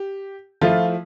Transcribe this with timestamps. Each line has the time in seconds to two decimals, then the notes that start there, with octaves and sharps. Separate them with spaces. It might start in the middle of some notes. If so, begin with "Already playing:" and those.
Already playing: G4
0.61 F3 A3 E4 F4